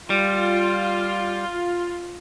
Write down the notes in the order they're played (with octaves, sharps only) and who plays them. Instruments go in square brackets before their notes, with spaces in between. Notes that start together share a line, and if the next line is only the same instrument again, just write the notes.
[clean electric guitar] G3 [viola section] F4